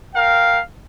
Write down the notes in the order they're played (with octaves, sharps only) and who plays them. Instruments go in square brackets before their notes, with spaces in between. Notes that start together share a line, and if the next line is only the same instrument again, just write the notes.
[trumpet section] A#4 F5 G5